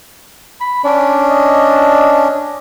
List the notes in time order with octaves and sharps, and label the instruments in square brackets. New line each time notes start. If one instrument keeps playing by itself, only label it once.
[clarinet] B5
[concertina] C#4 D4 [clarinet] D5
[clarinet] D#5